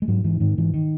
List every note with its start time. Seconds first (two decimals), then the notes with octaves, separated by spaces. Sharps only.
0.02 G#3
0.08 G#2 F#3
0.24 G#2 E3
0.40 G#2 D#3
0.58 G#2 E3
0.74 D#3